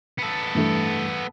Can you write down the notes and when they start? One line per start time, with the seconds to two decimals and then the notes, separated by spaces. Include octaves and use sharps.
0.19 B3 A4
0.55 G2 E3 A3